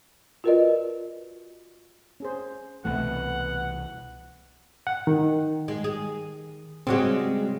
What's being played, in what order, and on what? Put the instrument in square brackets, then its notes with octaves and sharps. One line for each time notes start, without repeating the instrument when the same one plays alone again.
[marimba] F4 F#4 A#4 B4 D5 D#5
[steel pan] C#4 G#4 C5
[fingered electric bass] C2 B2 E3 [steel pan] A3 [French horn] B3 [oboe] F#5
[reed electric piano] F#5
D#3
[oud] G#3
G#4
[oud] C#3 G3 G#3 [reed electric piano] C4 F#4